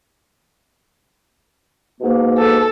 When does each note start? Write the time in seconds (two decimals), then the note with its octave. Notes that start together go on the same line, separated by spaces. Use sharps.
2.01 G#2 B2 A#3
2.38 A4